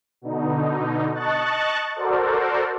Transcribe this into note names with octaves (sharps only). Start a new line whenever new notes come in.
B2 D3 D#4
D#5 A5 C#6 F#6 A6
F#4 A4 A#4 C5 D5